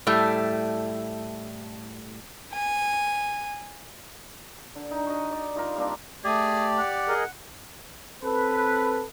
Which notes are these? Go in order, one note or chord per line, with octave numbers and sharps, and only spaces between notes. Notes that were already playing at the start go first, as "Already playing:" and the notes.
A2 G3 A3
G#5
D3
D#4
F#4 D#5
D5
G3 D#4 F4 A#4
G3 A#3 C4 D4
A3 G4 G#4 D5
F#5
G#4 A#4 D#5
C4 A4 B4